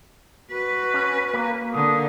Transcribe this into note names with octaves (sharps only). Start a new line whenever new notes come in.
F#4 B4
C#4
A#3
D3 D#6